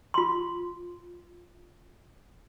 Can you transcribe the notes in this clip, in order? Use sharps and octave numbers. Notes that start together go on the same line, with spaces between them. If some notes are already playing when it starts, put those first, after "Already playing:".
F4 C6